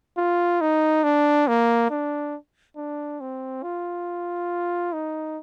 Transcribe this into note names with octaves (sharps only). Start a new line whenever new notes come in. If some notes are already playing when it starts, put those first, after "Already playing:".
F4
D#4
D4
A#3
D4
D4
C4
F4
D#4